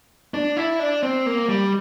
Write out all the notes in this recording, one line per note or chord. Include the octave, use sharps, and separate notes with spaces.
D4
E4
D4
C4
A#3
G3